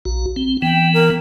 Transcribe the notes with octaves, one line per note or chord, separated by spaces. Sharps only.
A#1 F#4
C4
E3 B3 G5
A#4